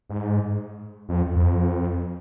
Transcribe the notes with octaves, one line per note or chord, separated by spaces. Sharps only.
G#2
F2
F2